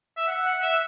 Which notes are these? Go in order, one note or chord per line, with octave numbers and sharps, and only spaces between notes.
E5
F#5
F#5
E5